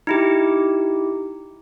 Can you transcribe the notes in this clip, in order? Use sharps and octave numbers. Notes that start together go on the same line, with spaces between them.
D#4 E4 G4